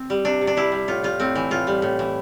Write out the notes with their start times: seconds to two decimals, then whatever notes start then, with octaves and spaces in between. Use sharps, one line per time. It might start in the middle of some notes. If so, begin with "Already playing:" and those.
Already playing: C4
0.10 G3
0.25 C3 D4
0.41 C3
0.47 D4
0.57 G3 E4
0.72 G3
0.88 A2 F4
1.03 G3 F4
1.20 A2 C4
1.35 E3
1.51 A2 F4
1.67 G3
1.82 A2
1.99 E3